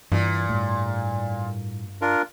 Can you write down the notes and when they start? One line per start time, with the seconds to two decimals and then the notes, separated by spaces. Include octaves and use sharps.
0.12 G2 A#2 E3
0.49 A2 G3
2.02 D4 F4 A#4